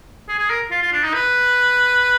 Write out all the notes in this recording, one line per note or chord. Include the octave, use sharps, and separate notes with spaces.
G#4
G#4
A#4
F4
F4
D4
D#4
B4